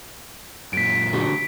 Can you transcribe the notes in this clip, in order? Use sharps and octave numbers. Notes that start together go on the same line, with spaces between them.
F#2 A#2 B6 D7
D3 F#4 G4